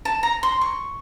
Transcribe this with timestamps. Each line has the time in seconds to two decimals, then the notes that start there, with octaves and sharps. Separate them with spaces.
0.05 A5
0.23 A#5
0.43 C6
0.61 C#6